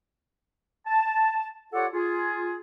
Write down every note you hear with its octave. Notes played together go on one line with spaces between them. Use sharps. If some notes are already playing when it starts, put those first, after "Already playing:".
A5
F4 G4 A4 C#5 D5 F#5
F4 G#4